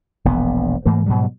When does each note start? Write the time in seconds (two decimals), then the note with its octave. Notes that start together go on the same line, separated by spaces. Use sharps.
0.25 E1 A#1 B3
0.85 G#2 E3 A3 A#3
1.06 G#2 B2 F#3 G3